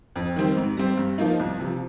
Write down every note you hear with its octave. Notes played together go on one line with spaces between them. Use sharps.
F2
D#3 G3 C4
G#2
G3 C4
G2
F3 A#3 D#4
C2
C3 F3